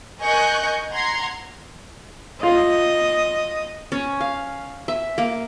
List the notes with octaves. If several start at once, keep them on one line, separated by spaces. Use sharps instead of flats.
A#4 D#5 G#5 C#6 F#6 G6
F#5 A#5 C6 G#6
F4 D#5
C#4
F5
E5
A#3